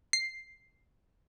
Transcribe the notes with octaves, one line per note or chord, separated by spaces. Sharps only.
C7